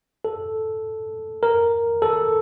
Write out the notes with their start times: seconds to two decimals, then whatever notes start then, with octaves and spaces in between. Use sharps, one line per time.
0.25 A4
1.43 A#4
2.02 A4